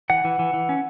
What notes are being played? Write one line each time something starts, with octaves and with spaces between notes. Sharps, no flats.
E3 F#5
E3
E3
E3
C#4